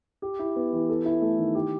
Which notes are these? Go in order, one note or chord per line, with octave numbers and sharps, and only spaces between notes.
G4
E4
B3
E3
A4
E4
A3
D#3
G4